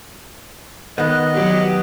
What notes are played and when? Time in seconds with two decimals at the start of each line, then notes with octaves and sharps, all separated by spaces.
0.98 D#3 B3 B4 D#5 F#5 F#6
1.34 F#3 G4